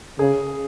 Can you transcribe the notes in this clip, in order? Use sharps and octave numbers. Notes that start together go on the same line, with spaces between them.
C#3 G#4